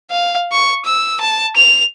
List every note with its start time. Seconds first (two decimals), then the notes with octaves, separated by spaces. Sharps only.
0.11 F5
0.52 C#6
0.85 E6
1.20 A5
1.56 F7